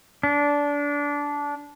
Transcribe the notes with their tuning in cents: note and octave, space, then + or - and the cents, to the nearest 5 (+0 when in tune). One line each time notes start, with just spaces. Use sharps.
D4 -20